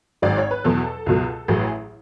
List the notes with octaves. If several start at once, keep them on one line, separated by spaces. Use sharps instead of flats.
G#1 G#2 F#3 D5
C#5
B4
E2 B2 F#3 A4
C#2 B2 F#3
A1 A2 F#3 G#4